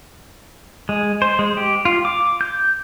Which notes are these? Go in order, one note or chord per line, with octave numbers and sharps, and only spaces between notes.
G#3
C5
G#3
G4
F4
D6
G6